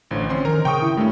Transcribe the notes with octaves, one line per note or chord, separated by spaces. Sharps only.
A1 D3 F3
C4 C#4 C6
D#3 A#4 A#5
C#3 G5 C#6 D#6
E4
G2 A3 C#4